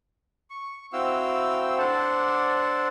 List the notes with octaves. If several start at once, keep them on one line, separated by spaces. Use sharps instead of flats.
C#6
C4 E4 F#4 F5 G5 E6
D4 A4 C5 D5 F#5 A5